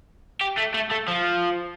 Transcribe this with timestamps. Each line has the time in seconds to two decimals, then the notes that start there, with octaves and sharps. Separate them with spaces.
0.41 G4
0.57 A3
0.74 A3
0.91 A3
1.08 F3